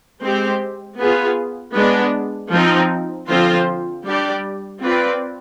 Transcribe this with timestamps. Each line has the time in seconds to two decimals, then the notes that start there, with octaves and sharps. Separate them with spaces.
0.22 G#3 C4 G4 C5
0.99 B3 F4 G#4
1.75 G#3 B3 D4
2.51 F3 C4 D#4
3.28 D3 F3 C4 F4 C5
4.04 G3 D4 G4 D5
4.81 C4 F4 B4 D5